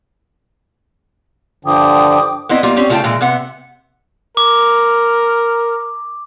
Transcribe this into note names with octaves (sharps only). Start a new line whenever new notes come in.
G2 D3 F3 G5 D6 D#6
B3 C4 E4 D#5
G3 A#3 F4
C4 C#4 G4
C#3 A3 F4 G4 G5 A5
A#2 E3 G#3
C3 B3 F#5
A#4 D6